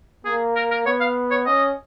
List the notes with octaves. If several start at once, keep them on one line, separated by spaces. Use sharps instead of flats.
A#3 G#4
A#4
A#4
B3 C#5
F5
C#5
C#4 D#5